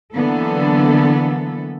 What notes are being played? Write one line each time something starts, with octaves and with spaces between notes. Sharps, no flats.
D3 E3 F#3 A#3 B3 A4